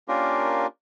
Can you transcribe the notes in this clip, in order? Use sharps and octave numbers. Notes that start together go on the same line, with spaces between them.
A#3 C#4 D4 F4 G4 A#4